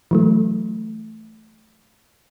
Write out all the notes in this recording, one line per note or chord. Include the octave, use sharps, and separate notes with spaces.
E3 F#3 A3